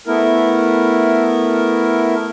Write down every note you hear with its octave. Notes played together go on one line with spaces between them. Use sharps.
A3 B3 E4 A#4